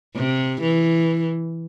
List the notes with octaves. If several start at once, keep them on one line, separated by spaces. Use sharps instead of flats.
C3
E3